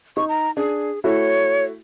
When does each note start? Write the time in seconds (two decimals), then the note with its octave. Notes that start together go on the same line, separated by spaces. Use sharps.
0.17 D#4 C#6
0.29 A#5
0.57 D4 G#4
1.04 A3 E4 F#4 C#5